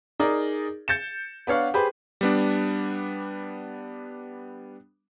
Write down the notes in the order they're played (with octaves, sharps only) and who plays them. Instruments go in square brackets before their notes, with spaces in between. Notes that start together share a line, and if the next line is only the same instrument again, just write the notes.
[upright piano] D#4 G#4 A#4 D5
G6 A6 C#7 E7
B3 D4 C#5 F5 F#5
G4 G#4 B4 C5
[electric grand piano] G3 B3 D4